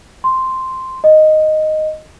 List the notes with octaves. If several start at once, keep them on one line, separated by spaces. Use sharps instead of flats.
C6
D#5